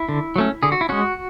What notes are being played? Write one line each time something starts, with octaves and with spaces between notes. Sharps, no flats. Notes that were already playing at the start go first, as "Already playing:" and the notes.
Already playing: E4
D3
F#3 A3 C#4
D3 G#4
F#4
E4
G#3 C#4 F#4